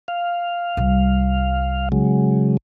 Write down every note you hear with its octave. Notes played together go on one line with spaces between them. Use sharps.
F5
C2 G3
C#3 F#3 G#3